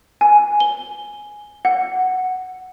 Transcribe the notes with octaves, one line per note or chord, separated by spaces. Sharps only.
G#5
G7
F#5